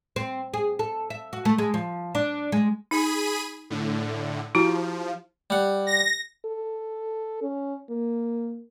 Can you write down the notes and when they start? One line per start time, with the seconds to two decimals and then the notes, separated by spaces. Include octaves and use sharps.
0.16 C4
0.54 G#4
0.79 A4
1.10 E5
1.33 F#4
1.45 A3
1.58 G#3
1.74 F3
2.15 D4
2.52 G#3
2.91 D#4 G#4 B5 D#7
3.70 A2 D3
4.55 F3 E4 F#4 G4
5.50 G3 F#5
5.87 A#6
6.45 A4
7.42 C#4
7.90 A#3